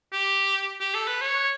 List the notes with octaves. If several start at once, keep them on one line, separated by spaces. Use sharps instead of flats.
G4
G4
A4
B4
C#5